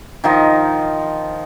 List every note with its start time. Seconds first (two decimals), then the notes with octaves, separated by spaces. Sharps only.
0.24 D#3 F3 D#4